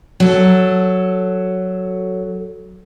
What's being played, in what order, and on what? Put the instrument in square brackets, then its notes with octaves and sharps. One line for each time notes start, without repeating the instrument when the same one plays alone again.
[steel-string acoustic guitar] F#3 A4